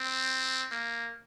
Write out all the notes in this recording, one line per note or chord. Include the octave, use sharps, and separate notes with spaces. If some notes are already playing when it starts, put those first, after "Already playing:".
Already playing: C4
A#3